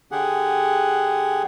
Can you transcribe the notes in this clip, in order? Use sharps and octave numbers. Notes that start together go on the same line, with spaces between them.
D3 G4 G#4 F#5